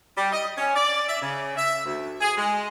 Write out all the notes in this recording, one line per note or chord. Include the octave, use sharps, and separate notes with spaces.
G3
D#5
C#4
D5
E5
C#3
E5
D2
G#4
G#3